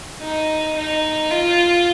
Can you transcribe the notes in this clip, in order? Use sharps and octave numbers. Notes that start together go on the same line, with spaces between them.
D#4
D#4
F4